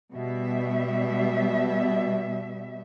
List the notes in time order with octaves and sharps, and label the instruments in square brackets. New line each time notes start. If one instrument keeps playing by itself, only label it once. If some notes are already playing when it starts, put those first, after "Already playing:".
[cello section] B2 G3 E5